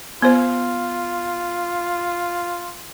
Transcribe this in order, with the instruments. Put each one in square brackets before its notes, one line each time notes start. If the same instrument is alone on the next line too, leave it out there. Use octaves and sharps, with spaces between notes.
[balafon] B3 C5 [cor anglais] F4